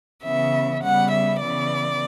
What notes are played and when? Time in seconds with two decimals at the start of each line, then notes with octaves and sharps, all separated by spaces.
0.24 C#3 E3 B3 E5
0.82 C#3 G3 B3 F#5
1.12 E5
1.41 C#3 E3 B3 D5